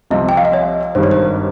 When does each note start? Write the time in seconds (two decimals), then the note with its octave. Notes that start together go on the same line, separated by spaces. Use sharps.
0.10 C2 C3 F3 D#5
0.29 G5
0.37 F5
0.45 D#5
0.53 C#5
0.95 G#1 G2 D#3 G3 C5
1.03 C#5
1.11 C5